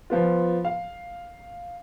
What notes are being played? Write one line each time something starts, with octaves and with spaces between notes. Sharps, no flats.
F3 B3 F4
F5